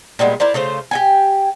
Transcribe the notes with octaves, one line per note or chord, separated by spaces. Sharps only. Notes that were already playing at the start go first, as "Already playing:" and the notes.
A#2 G3 G#3 B3
E4 A#4 C5 D5
C#3 A3 F4 C5
G4 G5 G#5